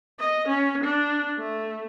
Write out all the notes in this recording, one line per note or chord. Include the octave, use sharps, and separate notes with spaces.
D#5
C#4
D4
A3